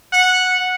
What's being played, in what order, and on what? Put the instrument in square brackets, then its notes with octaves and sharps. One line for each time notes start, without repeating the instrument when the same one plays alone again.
[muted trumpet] F#5